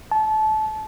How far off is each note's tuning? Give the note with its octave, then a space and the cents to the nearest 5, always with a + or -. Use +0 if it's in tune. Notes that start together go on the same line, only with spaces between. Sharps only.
A5 -25